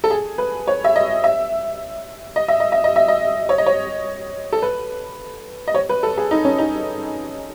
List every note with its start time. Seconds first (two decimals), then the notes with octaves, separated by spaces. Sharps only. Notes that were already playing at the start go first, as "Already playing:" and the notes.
0.04 A4
0.11 G#4
0.38 B4
0.68 C#5
0.84 E5
0.96 D#5
1.24 E5
2.36 D#5
2.48 E5
2.60 D#5
2.72 E5
2.84 D#5
2.96 E5
3.08 D#5
3.49 C#5
3.58 D#5
3.66 C#5
4.53 A4
4.62 B4
5.68 D#5
5.74 C#5
5.89 B4
6.03 A4
6.18 G#4
6.31 D#4
6.45 C#4
6.58 D#4